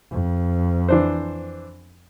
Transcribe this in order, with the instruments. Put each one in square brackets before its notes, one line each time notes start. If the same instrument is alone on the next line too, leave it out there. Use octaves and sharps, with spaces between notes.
[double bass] F2
[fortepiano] E3 D4 C5